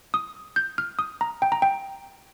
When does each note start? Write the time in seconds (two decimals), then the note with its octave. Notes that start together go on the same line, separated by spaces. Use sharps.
0.14 D#6
0.56 G6
0.78 F6
0.99 D#6
1.21 A#5
1.42 G5
1.52 A#5
1.62 G5